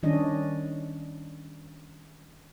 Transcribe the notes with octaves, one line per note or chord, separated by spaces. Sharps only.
D#3 G3 C#4 D4 D#5